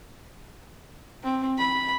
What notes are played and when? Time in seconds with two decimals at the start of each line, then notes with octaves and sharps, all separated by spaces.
1.23 C4
1.58 B5